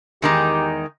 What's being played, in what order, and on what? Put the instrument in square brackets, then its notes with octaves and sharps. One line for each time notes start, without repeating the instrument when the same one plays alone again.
[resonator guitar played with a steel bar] E2 D#3 G#3 D#4 [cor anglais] G4